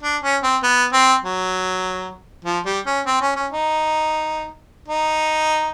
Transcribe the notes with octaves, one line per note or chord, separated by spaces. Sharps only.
D4
C#4
C4
B3
C4
F#3
F3
G3
C#4
C4
C#4
C#4
D#4
D#4